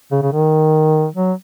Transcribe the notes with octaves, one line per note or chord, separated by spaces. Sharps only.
C#3
C#3
D#3
F#3